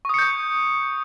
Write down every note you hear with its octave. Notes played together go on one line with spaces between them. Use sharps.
C#6 D#6 G6 C#7